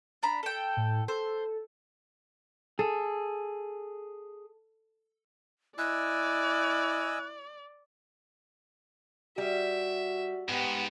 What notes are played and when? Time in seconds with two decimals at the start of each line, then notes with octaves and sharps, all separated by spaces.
0.23 D4 A#5 B5
0.43 A4 G5
0.77 A2
1.08 A4 C5
2.79 G#4 A4
5.78 E4 D5 D#5 G#5 E6 F#6
9.38 G3 F#4 E5
10.49 G#2 B3 G4